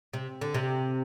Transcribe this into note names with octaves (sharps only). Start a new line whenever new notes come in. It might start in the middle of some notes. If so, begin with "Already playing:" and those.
C3
D3
C3